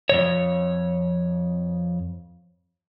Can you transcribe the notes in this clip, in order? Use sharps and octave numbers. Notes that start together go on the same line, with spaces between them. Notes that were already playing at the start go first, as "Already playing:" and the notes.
F2 C3 C#5